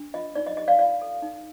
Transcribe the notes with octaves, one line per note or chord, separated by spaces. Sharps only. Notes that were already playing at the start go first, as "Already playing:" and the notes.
Already playing: D4
F4 D#5
D#4 D5
D#5
G4 D#5
D5 F5
F4 D5 F5
A4
D#4